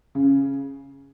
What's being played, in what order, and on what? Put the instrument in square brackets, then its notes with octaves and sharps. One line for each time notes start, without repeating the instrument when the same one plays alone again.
[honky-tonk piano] C#3